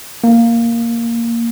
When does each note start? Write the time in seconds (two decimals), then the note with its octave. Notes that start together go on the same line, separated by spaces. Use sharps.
0.24 A#3